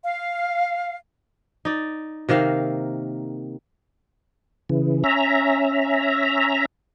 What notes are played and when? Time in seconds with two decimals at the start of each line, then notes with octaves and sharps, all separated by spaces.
0.04 F5
1.65 D#4 D5
2.29 C3 D#3 A#3 F5
4.69 C#3 E3
5.04 C#4 E5 A#5